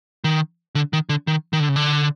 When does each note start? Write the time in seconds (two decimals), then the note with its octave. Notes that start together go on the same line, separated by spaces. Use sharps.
0.24 D#3
0.75 D3
0.93 D#3
1.09 D3
1.27 D#3
1.53 D#3
1.60 D3
1.69 C#3
1.76 D3